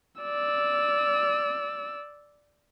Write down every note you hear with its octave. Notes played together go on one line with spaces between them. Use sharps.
D5 E6